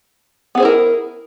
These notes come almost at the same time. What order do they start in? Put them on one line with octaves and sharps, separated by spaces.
B3 G#4 C5 E4 A#4